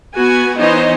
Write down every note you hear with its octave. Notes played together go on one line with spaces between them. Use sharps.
B3 F#4 G#5
E3 B3 D#4 C5 C#5 D#5